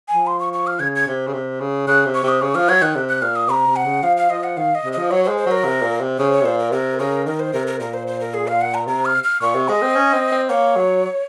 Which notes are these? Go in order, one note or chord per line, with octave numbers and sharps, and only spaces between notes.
F3 G#5
C6
C#6
C#6
F6
C#3 G#6
G#6
C3
C#3
C3
C#3
C#3 F#6
C3
C#6
C3
D#6
C#3 C#6
F3 F6
F#3 G#6
D#3 F#6
C3
F#6
A#2 F6
D#6
C3 A#5
C3
F#5
C#3
F3 F5
F5
F3 D#5
F#5
D#3 F5
D#5
C3
F3 D#5
F#3 C#5
C5
G#3
C5
F#3 A#4
C3
A#2
C3
C#3 C5
C#5
C3
A#2 C5
A#4
C3 A#4
C#3 A#4
D#3 A#4
C5
C3 A#4
A#4
A#2 A#4
C5
C5
A#4
G#4
F5
F#5
A#5
C3 A#5
F6
F6
A#2 C#6
C3
G#3 D#5
C4
C#4
C4
C4
A#3 C#5
F#3